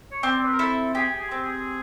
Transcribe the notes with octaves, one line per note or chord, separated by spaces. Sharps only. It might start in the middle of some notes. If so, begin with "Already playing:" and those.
C#5
C4 D5
B4
A#4
E4 A4
G4 G#4
G#4
C4
G#4